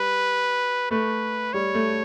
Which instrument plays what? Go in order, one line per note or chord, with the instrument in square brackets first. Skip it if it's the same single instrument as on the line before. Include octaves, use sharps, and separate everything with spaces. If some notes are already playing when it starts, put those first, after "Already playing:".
Already playing: [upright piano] G3 [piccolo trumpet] B4
[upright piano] A3 [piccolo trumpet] B4
[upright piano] G3 [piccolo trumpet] C#5
[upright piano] A3